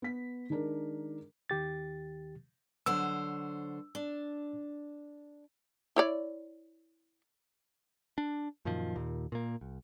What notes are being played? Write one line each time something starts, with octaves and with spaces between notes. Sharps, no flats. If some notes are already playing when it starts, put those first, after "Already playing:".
B3 B6
D#3 G#3 D4 A#4
D#2 D#3 G4 A6
D3 F#3 C5 E6
D4
E4 C#5 D5
D4
F#2 A#2 D#3 F3
D#2 A#2
A#2 A#3
C2